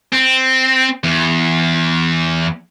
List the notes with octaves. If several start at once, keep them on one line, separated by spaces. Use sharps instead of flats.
C4
E2